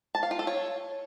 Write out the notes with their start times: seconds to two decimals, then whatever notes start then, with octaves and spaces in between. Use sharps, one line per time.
0.15 A5
0.23 F5
0.31 F4
0.39 A4
0.47 C#5